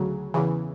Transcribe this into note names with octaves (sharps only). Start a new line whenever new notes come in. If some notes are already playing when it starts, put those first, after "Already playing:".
Already playing: D2 C#3 F#3
E2 C#3 E3